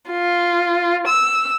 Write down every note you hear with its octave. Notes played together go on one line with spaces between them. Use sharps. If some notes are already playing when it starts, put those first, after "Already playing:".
F4
E6